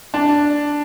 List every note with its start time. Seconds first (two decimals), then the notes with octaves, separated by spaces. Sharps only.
0.14 D4